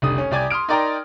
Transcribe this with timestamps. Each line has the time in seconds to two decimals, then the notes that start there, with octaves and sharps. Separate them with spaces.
0.02 F1 C2 D3 D#6
0.18 C#4
0.31 C2 G4 D5 G#5 D6 G#6
0.50 C6 D#6 F6 D7
0.69 D#4 A#4 D5 G5 A#5 C6